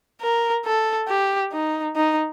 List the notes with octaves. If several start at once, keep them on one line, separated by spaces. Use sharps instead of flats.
A#4
A4
G4
D#4
D#4